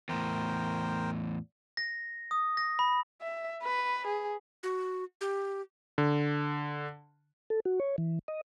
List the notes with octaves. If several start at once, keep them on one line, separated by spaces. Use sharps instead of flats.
E2 A2 A#4 C5 G5
A#6
D#6
A#6
B5
E5
B4
G#4
F#4
G4
D3
A4
F#4
C#5
E3
D#5